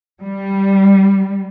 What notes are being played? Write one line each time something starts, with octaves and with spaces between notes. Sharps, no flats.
G3